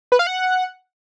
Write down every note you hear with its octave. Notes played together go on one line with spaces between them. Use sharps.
B4
F5
F#5